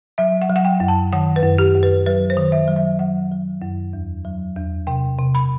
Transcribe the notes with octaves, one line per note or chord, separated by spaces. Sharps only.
F#3 E5
F#5
F#3
F#5
G5
F#2
A5
D#3 F#5
B4
F#2
G4
F#2
B4
F#3 B4
C5
D#3
E5
F#3
E5
F#3 F#5
F#3
F#2
E2
F#3
E2
C3 G5
C3
B5